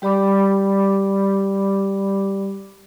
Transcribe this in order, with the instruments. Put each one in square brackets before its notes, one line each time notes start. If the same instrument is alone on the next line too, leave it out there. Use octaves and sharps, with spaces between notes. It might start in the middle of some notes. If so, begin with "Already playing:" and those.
[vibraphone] G3 G4 D5 B5 D6